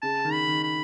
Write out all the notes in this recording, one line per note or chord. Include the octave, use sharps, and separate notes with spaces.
C#3 A5
D#3
B5
D#3
B5